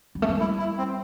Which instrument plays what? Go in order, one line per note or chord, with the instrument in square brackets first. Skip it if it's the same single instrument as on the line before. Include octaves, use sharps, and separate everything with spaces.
[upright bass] G3
A3
G3
[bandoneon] E4
E4
C4